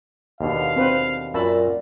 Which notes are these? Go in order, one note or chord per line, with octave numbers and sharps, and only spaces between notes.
D#2 B2 D3 F5
C4 B4 C5
F#2 A#2 F#4 E5 A5 B5